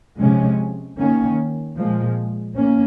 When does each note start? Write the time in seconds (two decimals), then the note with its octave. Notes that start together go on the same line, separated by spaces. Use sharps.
0.18 C3 F3 G#3 C#4
0.97 D#3 A#3 C#4
1.76 A#2 F3 G#3
2.56 A#3 C#4